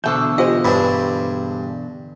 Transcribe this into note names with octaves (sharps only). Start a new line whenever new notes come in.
E2 B2 D3 A3 A4 C5 G6
G#3 F4 G4 C5 D#5
G2 G#3 C4 D4 B5